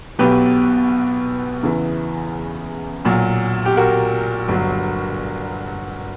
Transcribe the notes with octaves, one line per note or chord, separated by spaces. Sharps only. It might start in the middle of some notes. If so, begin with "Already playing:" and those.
B1 B2 F#3 G4 B4
E2 C#3 E3
B1 A#2 F#3
G4
F#4 A#4
G1 G2 F#3